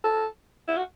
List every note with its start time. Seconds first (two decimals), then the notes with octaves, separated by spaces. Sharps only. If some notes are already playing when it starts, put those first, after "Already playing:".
0.04 A4
0.68 E4
0.77 F#4